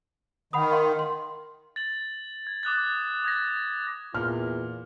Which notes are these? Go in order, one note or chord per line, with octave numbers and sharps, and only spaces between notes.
D#3 F#5 B5 D#6
F5 C6
C6
A6 F#7
G#6
D6 D#6 F#6 A6
D#6 G#6 A#6
E2 A#2 F4 F6